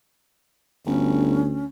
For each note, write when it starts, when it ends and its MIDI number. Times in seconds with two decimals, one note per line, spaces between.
0.86 1.44 31
0.86 1.65 38
0.86 1.66 61